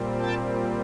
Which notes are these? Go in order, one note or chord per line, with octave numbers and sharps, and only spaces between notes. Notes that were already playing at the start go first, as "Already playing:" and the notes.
Already playing: A#2 G3 C4
G5 A5